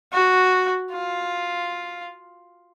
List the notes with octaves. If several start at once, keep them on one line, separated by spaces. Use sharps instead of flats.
F#4
F4